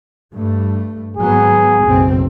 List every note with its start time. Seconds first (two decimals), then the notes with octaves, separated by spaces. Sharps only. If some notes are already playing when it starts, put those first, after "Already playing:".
0.34 G2 A3
1.17 G#1 F#3 B3 G#4
1.85 F#1 B1 C4